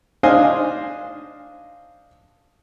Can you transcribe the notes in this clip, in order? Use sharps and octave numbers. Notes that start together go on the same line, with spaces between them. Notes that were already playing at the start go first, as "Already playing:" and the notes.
D4 C5 D#5 F5 G#5